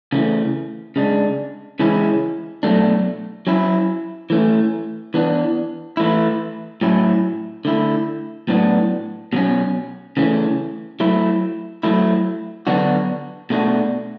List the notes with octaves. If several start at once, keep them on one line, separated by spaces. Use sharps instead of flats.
C#3 E3 A3
C#3 G#3 D4
C#3 E3 G#3 C#4 E4
B2 F#3 A3 D4
F#3 C#4 E4
E3 A3 C#4
E3 B3 D4
E3 A3 E4
A2 F#3 C#4 E4
D3 A3 E4
A2 F#3 B3 D4
B2 F#3 C#4
C#3 E3 A3 C#4
F#3 A3 E4
F#3 A3 E4
D3 F#3 B3 D4 F#4
B2 A3 D4 F#4